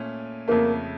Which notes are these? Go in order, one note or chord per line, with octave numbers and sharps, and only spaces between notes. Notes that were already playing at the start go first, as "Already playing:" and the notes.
Already playing: A#2 A3 C#4
F2 C#3 F3 A3 A#3